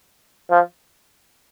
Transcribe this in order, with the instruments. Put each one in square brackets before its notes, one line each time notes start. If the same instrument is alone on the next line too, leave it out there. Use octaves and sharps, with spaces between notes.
[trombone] F3